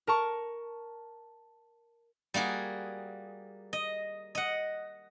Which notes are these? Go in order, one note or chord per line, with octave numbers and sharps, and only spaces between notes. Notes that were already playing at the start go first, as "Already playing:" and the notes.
A#4 A5 C#6
G3 A#3 F#4 G#4
D#5
D#5 F#5